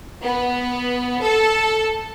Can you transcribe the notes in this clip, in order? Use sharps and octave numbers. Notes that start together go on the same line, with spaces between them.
B3
A4